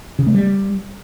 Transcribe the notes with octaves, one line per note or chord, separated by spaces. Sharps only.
C#3
A3
G3